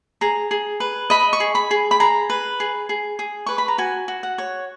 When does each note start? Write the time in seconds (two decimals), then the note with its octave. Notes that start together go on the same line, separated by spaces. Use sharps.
0.21 G#4 A#5
0.51 G#4
0.80 B4
1.10 D#5 B5
1.33 C#6
1.40 G#4
1.55 B5
1.71 G#4
1.91 B5
2.00 G#4 A#5
2.30 B4
2.60 G#4
2.89 G#4
3.19 G#4
3.46 B4 C#6
3.58 B5
3.68 A#5
3.78 F#4 G#5
4.08 F#4
4.23 F#5
4.38 C#5